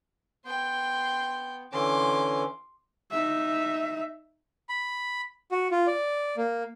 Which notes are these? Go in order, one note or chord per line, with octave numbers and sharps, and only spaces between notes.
B3 G5 C6
D3 E3 C#4 C6 D6
D#4 E5
B5
F#4
F4
D5
A#3